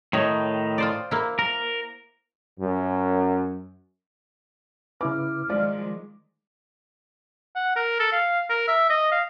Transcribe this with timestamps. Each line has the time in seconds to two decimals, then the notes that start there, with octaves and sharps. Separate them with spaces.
0.13 A2 D#3 D#4 C#5
0.78 F4 C5 D5
1.11 A#3 E4
1.39 A#4
2.60 F#2
5.01 C#3 E4 B4 D6 F6
5.50 D#3 F3 G#3 F4 D5
7.56 F#5
7.76 A#4
8.00 A4
8.12 F5
8.49 A#4
8.68 E5
8.89 D#5
9.12 F5